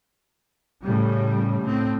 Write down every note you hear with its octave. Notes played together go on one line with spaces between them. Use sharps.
A2 C#3 G3
A2 C4